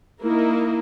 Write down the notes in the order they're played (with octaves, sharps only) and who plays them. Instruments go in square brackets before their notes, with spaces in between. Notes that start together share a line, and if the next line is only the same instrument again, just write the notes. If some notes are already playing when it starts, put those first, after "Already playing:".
[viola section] A#3 D#4 E4 A#4